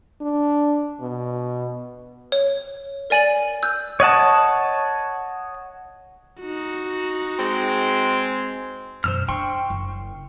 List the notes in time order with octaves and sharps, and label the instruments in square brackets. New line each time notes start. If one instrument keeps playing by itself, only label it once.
[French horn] D4
B2
[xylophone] C#5
A#4 D5 G#5 A6 F#7
E6 F#6 G6
[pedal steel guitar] C#5 D#5 F#5 A5
[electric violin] D#4 F#4
[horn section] G#3 C4
[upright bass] F#2 B2 [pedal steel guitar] C5 E6 F6
[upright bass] D4 [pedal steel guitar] G5 C6 C#6
[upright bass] F#1